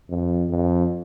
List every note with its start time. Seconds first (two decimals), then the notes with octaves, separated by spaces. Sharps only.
0.09 F2
0.49 F2